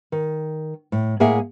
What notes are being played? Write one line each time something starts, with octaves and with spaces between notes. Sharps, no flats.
D#3
A2
A2 A#3 G#4 E5 F#5 G#5